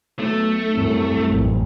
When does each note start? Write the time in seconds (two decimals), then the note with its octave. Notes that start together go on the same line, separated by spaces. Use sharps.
0.19 B1 A3
0.73 C2 F#2
1.27 A1 F2